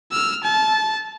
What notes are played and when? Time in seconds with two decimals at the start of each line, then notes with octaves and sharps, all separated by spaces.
0.12 E6 F6
0.43 A5